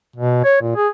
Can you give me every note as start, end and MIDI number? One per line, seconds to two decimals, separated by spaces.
0.16 0.43 47
0.44 0.58 73
0.61 0.75 46
0.76 0.89 68